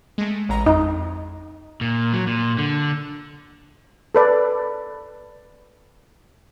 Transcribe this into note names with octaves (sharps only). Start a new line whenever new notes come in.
G#3 A3
A1 G#3 A#5
F2 D#4
A#2
F#3
A#2
D3
A4 B4 D5